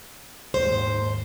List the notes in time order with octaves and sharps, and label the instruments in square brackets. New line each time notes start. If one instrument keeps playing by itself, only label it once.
[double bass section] D#2 G#2 [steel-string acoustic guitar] C5